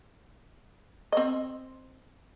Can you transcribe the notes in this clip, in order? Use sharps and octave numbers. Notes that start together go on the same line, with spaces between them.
C4 D#5